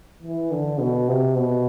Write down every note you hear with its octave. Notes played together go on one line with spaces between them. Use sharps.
E3
D3
B2
C3
B2